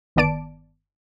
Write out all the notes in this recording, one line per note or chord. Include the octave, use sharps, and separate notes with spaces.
G1 D#3 B3 D5 A5 D7